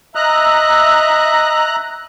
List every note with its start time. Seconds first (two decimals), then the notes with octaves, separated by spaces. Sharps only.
0.15 D#5 E5 A#5 F#6